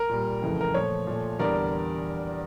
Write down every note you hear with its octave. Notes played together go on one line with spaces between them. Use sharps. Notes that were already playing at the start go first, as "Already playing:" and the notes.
Already playing: A#4
A#2 G3
F2 C#3 E3 A3
A#4
A#2 F3 A3 C#5
A#2 F3 A3
E2 D3 G3 A#4 D5